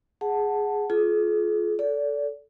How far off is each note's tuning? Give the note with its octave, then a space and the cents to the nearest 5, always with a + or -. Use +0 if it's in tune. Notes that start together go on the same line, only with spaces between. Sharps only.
G#4 +0 F#5 +0 A5 +0
F4 +0 G#4 +40
A4 +0 D5 -30